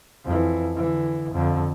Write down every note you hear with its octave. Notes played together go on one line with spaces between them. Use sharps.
F2 E3
D3 E3
F2 D3